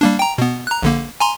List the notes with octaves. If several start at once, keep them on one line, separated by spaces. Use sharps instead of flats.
G3 A#3 D4
G5 A#5
B2 B3
A#5 F#6
A#1 D3 A#3
G#5 A#5 C6